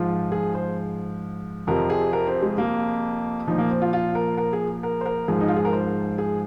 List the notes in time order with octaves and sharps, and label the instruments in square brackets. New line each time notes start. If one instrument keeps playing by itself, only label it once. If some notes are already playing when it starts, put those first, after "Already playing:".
Already playing: [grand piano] G#2 F3 F4
G#4
C5
F2 C3 F3 A#4
G#4
A#4
C4
G#3
A#3
A#2 F3 D#4
A#3
C4
F4
F4
A#4
A#4
G#4
A#4
C5
A#4
G#2 F3 G#4
D#4
F4
G#4
A#4
C5
G#4